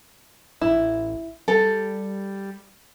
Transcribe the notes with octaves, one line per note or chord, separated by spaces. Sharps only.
A1 E4
G3 A4 G5